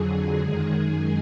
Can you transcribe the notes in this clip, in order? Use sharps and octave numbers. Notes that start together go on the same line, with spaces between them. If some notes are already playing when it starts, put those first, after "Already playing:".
Already playing: F2 D3 F#3 G#4
F#2 D#3 G#3 G#4